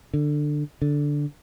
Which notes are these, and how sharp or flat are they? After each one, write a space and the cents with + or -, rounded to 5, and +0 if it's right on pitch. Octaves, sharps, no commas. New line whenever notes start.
D3 +15
D3 -5